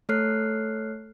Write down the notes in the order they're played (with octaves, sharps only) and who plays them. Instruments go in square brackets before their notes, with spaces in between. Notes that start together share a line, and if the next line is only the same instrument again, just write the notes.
[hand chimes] A3 A4 C#5 F6 F#6 C7